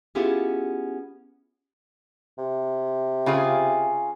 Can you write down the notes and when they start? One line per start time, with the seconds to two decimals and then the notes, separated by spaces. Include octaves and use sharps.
0.15 B3 C#4 E4 F4 G4 G#4
2.38 C3
3.26 C#3 F4 G#4